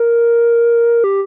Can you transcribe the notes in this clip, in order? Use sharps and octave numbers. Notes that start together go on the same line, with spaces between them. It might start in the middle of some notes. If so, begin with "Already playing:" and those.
Already playing: A#4
G4